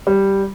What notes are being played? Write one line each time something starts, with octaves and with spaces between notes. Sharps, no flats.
G3